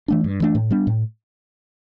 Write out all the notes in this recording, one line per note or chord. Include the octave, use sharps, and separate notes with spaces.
E3 A3 D4
G2
E3 A3 D4
A2
G3 B3 D4
A2